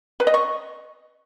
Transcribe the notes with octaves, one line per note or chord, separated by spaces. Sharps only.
B4
D#5
C#6